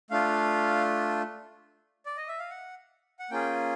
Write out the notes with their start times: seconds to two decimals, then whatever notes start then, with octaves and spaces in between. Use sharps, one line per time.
0.11 A3 D4 F4 F5
2.06 D5
2.17 D#5
2.28 E5
2.39 F5
2.50 F#5
3.19 F#5
3.30 A#3 C#4 F4 G#4 G5